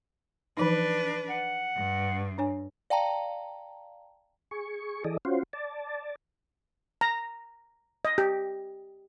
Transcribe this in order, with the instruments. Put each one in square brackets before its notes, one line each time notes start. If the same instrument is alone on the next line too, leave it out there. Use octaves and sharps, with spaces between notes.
[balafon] E3 F3 D#4 [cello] D4 B4
[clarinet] F#5
[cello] G2
[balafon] D4 C#5 G#5
[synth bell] D5 F5 G5 A5 A#5
[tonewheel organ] G#4 C#6
E3 G#4 A4 D5 D#5
C#4 F4 F#4 C5
D5 A5
[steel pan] A#5
D#5
G4